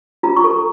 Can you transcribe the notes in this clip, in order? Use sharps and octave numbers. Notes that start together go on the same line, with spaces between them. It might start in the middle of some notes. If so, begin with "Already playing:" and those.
F4 A#5
C#6
A4
A#5